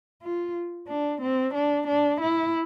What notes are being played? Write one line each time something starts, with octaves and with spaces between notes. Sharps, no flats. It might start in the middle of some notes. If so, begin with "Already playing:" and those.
F4
D4
C4
D4
D4
E4